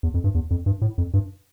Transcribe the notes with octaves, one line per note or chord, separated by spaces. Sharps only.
E2
F2
G2
E2
F2
G2
A2
F2
G2